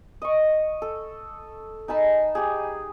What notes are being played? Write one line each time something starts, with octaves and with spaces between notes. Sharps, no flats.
D#5 C#6
A4
D#4 G#5 A5 B5
G4 G#4